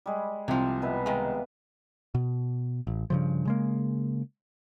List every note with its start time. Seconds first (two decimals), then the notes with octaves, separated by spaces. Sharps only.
0.06 G3 G#3
0.48 C2 C3 F3
0.82 B2 B4 E5
1.06 D#3 G#3 F5
2.15 B2
2.87 A1
3.10 G2 C#3 F3
3.45 C#3 G#3 A#3